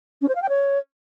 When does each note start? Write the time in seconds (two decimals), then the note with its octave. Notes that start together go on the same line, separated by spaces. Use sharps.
0.21 C#4
0.28 C5
0.35 F5
0.42 G5
0.49 C#5